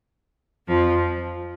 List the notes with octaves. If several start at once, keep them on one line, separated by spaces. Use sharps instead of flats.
F2 F3